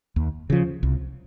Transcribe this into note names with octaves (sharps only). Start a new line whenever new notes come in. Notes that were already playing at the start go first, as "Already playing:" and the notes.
D#2
C#3 F3
C2